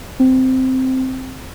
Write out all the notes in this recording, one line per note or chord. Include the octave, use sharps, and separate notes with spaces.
C4